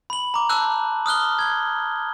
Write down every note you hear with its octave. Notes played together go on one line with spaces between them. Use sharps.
B5 F#7
A#5 D6
A5 D6 E6 F#6 G6
D#6 F6 F#6 G7
G#6 G7